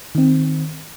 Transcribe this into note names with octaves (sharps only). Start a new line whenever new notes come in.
D#3 C4